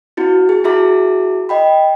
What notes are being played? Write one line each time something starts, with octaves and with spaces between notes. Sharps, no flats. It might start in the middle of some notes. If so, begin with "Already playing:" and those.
C4 E4 F#4
G#4
E4 F#4 G#4 E5 A#5 D6
D#5 G5 B5